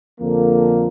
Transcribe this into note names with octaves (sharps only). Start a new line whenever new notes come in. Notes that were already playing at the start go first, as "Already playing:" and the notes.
F2 D3 F3 A#3